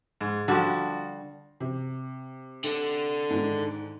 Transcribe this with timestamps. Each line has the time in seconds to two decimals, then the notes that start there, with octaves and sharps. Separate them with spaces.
0.21 G#2
0.48 D3 F3 G3 D4 F#4
1.60 C3
2.64 D3
3.30 G#2 D#3